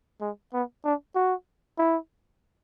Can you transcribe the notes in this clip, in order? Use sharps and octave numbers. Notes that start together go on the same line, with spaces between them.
G#3
B3
D4
F#4
E4